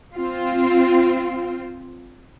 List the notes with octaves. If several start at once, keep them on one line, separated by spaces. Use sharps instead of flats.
C4 F4